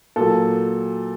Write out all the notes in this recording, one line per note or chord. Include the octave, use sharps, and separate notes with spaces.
A#2 F#3 A4